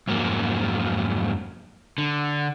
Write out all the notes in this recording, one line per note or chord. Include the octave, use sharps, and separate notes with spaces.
F2 G#2 F#3 A#3
D3